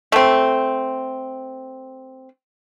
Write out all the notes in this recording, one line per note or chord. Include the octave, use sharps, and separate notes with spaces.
A3 C4